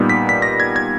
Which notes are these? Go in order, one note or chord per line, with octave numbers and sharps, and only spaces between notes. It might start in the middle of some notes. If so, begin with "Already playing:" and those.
Already playing: A#2 G3 B3 D#4
B6
B6
A#6
G#6
G#6